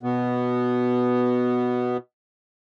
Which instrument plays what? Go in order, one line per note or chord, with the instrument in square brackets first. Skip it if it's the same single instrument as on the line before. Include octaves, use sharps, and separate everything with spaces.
[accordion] B2 B3